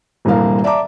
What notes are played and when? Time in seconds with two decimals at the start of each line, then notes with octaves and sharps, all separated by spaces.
0.25 D#1 C2 G2 E3 A#3 F5
0.64 D5 E5 A5 A#5 D6